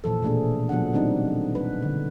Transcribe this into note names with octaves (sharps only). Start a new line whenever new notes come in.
A#2 E3 F3 A4
B2 A3 A#3 D4 G#4
F3 F#3 B3 D4 F#5
D#3 G3 C4 D4 D#4
B4
D3